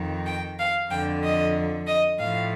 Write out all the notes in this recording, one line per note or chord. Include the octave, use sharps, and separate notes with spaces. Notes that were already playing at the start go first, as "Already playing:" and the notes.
Already playing: F2 D#3
G5
F5
F2 D3 F3 G5
D#5
D#5
A2 F3 F5